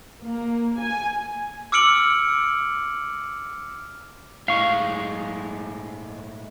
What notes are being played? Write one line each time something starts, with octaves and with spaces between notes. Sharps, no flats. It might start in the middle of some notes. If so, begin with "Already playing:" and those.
A#3
G#5
D6 E6 F6 C#7 D7 F#7
A2 G#3 F5 C#6